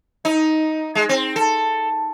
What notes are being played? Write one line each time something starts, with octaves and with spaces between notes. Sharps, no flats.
D#4
G#3
C4
A4